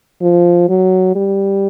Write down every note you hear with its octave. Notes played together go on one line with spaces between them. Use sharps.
F3
F#3
G3